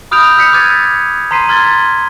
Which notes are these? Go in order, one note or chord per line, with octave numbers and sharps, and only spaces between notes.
B5 D#6 F6 G6 D7 F7
E6 F6 B6 C#7
D6 F6 F#6 G#6 A6 D#7
A#5 C6 B6 C7 D#7
C6 F6 G#6 A6 G7